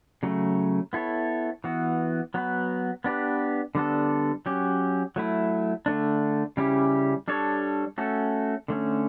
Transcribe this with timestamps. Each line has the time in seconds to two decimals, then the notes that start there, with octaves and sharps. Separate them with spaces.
0.23 C#3 F#3 A3
0.93 B3 E4 A4 C#5
1.64 E3 B3 F#4
2.34 F#3 B3 F#4 B4
3.04 B3 D4 G4 B4
3.75 D3 G3 B3 D4 A4
4.46 F#3 C#4 G4
5.16 F#3 A3 E4
5.86 D3 A3 D4
6.57 C#3 G3 C#4 E4 G4
7.28 G3 D4 A4 C#5
7.98 A3 C#4 F#4 A4
8.68 D3 A3 C#4